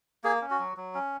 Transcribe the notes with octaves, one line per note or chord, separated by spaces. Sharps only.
A#3 G#4
C#4
F#4
F#3
F#3
C#4